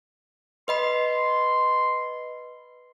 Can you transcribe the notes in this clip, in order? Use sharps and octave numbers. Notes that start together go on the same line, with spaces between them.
B4 D#5 B5 C6